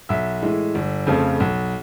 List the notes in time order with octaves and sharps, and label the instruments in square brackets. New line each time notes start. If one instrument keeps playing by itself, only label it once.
[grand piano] B1 E5
A2 E3 G#3
G1
F2 C#3 F3 A3
B1